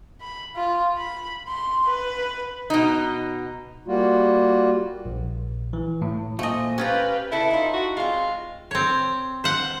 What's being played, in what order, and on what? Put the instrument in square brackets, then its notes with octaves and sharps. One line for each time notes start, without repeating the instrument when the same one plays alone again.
[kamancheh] B5
F4
B5
C6
B4
[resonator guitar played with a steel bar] B2 D#4
[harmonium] G3 A#3 F4 F#4
[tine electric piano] A#1
E3
A2
[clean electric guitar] A#2 F4 [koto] A3 D#5 [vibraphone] C5 G#5
[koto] C#4 F4 A#5 [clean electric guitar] G4 [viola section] B4 F5 G5
[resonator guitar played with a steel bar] C#3 A4 B4 [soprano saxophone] E4
[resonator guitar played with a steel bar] D#4 F4
[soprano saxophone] F#4
[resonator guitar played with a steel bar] G#3 C4 [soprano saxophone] F4
[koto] C4 C#5
C5 F#5